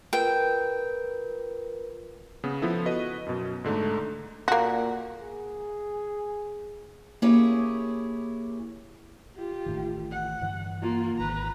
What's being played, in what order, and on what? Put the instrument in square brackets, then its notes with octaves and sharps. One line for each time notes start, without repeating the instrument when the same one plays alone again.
[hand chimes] F4 A#4 B4 [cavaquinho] G5
[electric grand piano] C#3 B3
F3 B3 E4 A4
F#4 B4 D#5
F#2 B2
G#2 D3 A3 D#4
[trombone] A#2 [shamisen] A#3 F#4
[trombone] G#4
[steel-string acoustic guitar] A#3 C#4 E4 G4 G#4 C#5
[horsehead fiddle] F4 G4
[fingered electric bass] A1 A2 D#3
[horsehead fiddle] F#5
[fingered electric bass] G2 D3 E3
[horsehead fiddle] A#3 F4
[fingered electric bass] G#1 D#3 [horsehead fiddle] B4 A#5